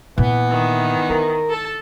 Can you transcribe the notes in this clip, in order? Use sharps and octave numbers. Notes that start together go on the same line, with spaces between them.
A#2 E3 B3
D#3
E4 A#4
A4 A5